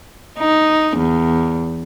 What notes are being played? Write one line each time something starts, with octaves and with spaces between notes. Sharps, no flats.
D#4
E2